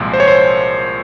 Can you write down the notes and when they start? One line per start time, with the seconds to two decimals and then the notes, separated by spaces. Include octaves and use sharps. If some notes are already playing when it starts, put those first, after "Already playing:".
Already playing: C2 A#2 F3 G#3
0.13 C5
0.20 C#5
0.28 C5